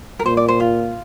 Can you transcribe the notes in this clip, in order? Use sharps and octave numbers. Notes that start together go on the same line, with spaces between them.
A#4
A#2 C5
D5
C5
F4